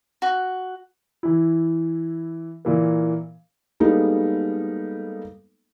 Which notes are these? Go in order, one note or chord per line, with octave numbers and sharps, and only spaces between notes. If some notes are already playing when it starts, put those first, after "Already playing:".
F#4
E3 E4
A#2 E3 A#3
G3 G#3 A#3 B3 D#4 A4